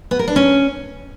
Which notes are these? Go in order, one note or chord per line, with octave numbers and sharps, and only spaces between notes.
B3
A#4
D4
C#4